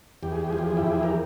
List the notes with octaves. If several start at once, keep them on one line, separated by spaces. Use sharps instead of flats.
E2 G4
G#4
G4
F3 G#4
G4
G#4
E4 G4
E2
G#4
A#4